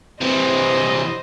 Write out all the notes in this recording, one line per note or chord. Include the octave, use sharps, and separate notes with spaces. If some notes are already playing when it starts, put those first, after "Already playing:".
C3 E3 C5 D#5